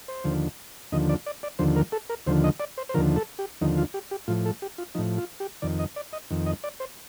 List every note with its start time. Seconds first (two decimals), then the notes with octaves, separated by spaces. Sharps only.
0.08 C5
0.24 D#2 D3 F3
0.92 D#2 D3 F3 D#5
1.09 D5
1.26 D5
1.43 D5
1.59 D#2 D3 F3 C5
1.76 A#4
1.92 A4
2.10 A#4
2.27 D#2 D3 F3 C5
2.44 D#5
2.60 D5
2.78 C5
2.89 C5
2.94 D#2 D3 F3 A#4
3.16 A4
3.39 G4
3.61 D#2 D3 F3 D#4
3.78 F4
3.94 G4
4.11 G4
4.28 A2 F3 F4
4.46 A4
4.62 G4
4.78 F4
4.95 F3 D#4
4.98 A2
5.18 F4
5.40 G4
5.62 F2 D#3 D5
5.79 D#5
5.96 D5
6.13 D#5
6.30 F2 D#3
6.46 D#5
6.64 D5
6.80 C5